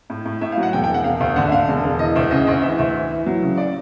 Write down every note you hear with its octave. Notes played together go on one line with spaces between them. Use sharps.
A2
A2
A2 E5
F5
F#3
F#5
E1 G5
G5
E1
F#5
E1 F5
D2 F5
D3 F#5
E5
D3 F5
E1
E1
E3 D#5
D2 E5
C#3 D#5
D2 D#5
E3 E5
D2 E5
E3
E3
F#3
C#3
D5